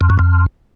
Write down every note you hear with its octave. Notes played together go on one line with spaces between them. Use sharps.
F2
F#2
F2